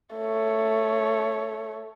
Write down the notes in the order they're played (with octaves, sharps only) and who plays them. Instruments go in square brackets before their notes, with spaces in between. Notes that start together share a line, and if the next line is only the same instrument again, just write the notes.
[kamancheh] A3 C#5